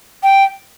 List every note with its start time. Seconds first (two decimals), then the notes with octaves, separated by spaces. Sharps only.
0.23 G5